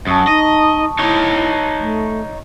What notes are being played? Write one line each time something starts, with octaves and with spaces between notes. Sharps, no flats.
F#2 C#4 A5 C#6 D#6
D#4 D#5
D#4 E4 C#5
A3